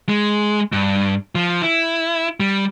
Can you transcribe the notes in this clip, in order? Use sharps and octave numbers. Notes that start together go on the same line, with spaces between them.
G#3
G2
F3
E4
G3